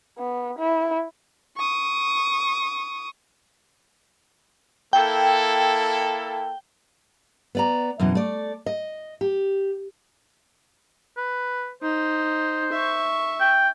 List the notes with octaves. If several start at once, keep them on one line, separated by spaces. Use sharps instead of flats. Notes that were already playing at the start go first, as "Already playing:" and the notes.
B3
E4
C#6 D#6
A#3 E4 A4 G5
B3 D5 A#5
F#2 B2 E3
A3 D5
D#5
G4
B4
D#4 C5
E5 C#6
G5